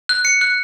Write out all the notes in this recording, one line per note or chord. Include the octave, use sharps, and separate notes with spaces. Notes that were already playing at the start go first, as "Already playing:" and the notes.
F#6
C#7
F#6